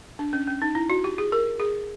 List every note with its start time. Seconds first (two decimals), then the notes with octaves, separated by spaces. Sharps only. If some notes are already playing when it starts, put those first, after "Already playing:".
0.19 D4
0.33 C#4
0.47 C#4
0.62 D#4
0.75 E4
0.90 F#4
1.04 G4
1.18 G#4
1.32 A#4
1.60 G#4